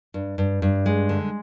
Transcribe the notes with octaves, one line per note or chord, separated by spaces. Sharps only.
G2
G2
G2
G#3
D3